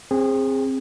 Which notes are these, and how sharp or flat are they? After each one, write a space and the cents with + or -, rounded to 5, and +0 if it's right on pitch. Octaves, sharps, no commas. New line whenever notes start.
C4 +15 G#4 -20